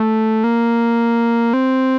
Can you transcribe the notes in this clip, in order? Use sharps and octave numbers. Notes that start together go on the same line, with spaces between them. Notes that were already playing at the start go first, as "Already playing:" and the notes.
Already playing: A3
A#3
C4